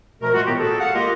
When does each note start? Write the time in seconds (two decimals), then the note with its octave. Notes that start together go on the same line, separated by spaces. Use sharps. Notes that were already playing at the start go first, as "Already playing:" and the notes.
0.22 B2 F3 A3 A#4
0.34 A#2 G#3 A3 F4 F#4
0.47 A2 D#3 G#3 B3 G4
0.59 F#4 G#4 A4
0.80 F5 F#5
0.95 G#3 A#3 F4 G4 A#4 D#5